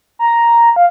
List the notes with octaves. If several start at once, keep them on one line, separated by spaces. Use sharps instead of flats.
A#5
F5